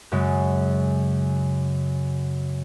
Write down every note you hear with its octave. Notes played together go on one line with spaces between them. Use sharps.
F#2 C#3 G#3